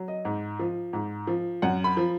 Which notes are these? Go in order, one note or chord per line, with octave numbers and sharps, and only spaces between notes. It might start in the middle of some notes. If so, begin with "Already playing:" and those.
Already playing: F#3
D#5
G#2
F3
G#2
F3
F#2 F#5
B5
F3